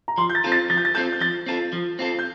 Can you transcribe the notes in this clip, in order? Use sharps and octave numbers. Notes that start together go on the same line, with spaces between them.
A#5
F3 C6
G6
A6
C4 F4 A4
A6
F3 A6
G6
A6
C4 F4 A4 G6
G6
F3 A6
C4 F4 A4
F3
C4 F4 A4
G6